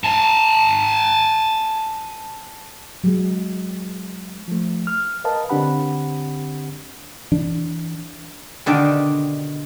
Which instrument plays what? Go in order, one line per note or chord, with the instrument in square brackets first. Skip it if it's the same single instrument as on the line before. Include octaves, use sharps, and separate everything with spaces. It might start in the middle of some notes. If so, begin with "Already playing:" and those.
[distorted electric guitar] G#5 A5
[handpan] F#3 G#3
[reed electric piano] F3 A3
F6
A#4 B4 D#5 F5 A5
D3 C4 D4 G4 F#5 B5
[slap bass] E3 D4
[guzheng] B2 D3 D#3 G4